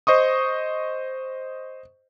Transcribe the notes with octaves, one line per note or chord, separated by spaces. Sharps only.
C5 D#5 C#6 D#6